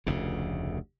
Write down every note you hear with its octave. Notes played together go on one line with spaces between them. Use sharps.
F1 D2 C#3